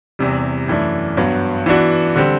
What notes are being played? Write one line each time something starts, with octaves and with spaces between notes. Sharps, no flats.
E2 C3 G3
F#2 E3 A3 D4
G2 F#3 B3
E3 B3 D4 F#4
D3 G3 C4